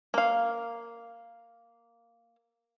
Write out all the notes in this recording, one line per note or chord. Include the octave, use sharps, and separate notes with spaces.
A#3 F5